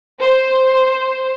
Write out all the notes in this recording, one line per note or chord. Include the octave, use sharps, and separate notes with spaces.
C5